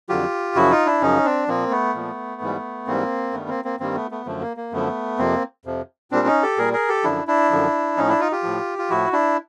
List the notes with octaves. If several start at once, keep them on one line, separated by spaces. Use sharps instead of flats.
F2 D3 F#3 F4 G4
F#2 C#3 F3 E4 F#4
D#4 F4
D4 E4
F#2 C#3 F3 C#4 D#4
C4 D4
A#2 F3 A#3 C4
A3 B3
A#2 F3
G#2 E3 G3
G#2 E3 G3 A#3 C4
G2 D#3 G3 A3 B3
A#3 C4
A#3 C4
G2 D#3 G3 A#3 C4
A3 B3
A3 B3
F#2 D3 F3 A3
A#3
A#3
F#2 D3 F3 A3 B3
F2 C3 F3 A#3 C4
F2 C3 F3
A#2 G3 C4 D4
C#4 D#4
G4 A4
A#2 G3 G#4 A#4
G#4 A#4
G4 A4
F#2 D3 F3 D4 E4
D4 E4
F#2 D3 F3
A2 F3 C#4 D#4
D4 E4
D#4 F4
F4 G4
A2 F3
F4
A2 F3 E4 F#4
D4 E4